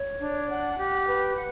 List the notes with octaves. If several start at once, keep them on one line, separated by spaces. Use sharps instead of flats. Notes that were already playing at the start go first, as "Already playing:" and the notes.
Already playing: C#5
D4
F#5
G4
B4
F#5